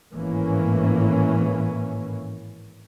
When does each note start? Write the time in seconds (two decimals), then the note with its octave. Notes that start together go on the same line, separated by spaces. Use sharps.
0.14 G#1 A2 E3 A#3 C#4